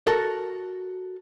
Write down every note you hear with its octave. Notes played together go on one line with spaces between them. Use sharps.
F#4 A4 A#4